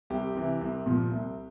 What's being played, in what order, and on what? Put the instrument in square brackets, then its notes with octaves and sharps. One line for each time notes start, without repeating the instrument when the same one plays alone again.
[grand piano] C2 G4
C3 E3
C2
A#2 F3
C2